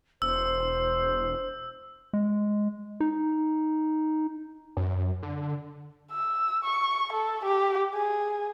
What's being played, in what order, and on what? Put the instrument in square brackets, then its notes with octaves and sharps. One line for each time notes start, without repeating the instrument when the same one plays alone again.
[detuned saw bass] E1 [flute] C5 [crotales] E6
[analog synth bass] G#3
D#4
[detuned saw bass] F#2
D3
[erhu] E6
C#6
A4
G4
G#4